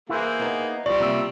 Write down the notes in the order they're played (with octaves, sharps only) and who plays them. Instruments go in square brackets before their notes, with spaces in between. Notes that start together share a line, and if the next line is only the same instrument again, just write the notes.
[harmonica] A#3 G#4 [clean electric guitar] E4 B4 C5
[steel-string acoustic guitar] B3 D#4
[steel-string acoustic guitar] F3 [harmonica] G3 [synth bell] D5 C#6
[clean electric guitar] C3 A#3 E5